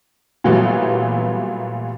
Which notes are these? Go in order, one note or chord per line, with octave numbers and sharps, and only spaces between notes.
A#2 E3 F#3 G3 A3 B3